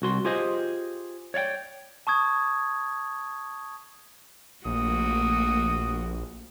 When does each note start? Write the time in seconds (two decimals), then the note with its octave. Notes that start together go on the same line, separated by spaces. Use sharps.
0.02 C2 F#4 C6
0.25 F4 G4 G#4 C5 D#5
1.34 C#5 D5 F5 G5
2.07 A5 C#6 D#6 G#6
4.65 A#1 A3 A#3 F#4 D#6